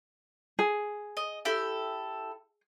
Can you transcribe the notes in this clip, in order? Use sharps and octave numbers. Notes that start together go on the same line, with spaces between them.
G#4
D#5
E4 G4 A4